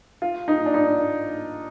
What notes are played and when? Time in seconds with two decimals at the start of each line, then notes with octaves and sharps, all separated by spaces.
0.22 F4
0.48 D#4
0.66 D4
0.74 D#4